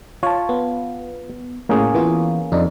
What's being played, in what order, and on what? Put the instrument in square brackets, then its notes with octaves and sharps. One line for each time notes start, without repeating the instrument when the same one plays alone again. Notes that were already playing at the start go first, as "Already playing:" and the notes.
[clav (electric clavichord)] F4 A5 [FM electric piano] C#5
[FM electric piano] B3
[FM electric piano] A2 [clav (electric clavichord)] A#3 C#4 G#4
[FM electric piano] E3 B3 F4
[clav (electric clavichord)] F2 [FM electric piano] D4 D#4